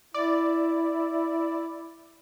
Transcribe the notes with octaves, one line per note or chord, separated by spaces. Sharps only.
E4 D5